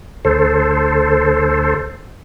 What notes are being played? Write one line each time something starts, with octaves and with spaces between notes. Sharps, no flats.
D2 A4 C5